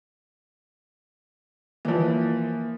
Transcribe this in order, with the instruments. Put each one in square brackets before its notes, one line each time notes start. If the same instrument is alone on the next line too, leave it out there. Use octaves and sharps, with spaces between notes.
[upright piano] E3 F3 [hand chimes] A#3